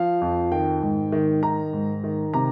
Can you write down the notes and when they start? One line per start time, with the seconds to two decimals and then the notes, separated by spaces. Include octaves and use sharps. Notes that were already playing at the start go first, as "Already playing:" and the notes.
Already playing: F3 F5
0.21 F2
0.52 D#3 G5
0.82 G#2
1.12 D#3
1.43 D#3 A#5
1.73 G#2
2.04 D#3
2.34 C3 A#5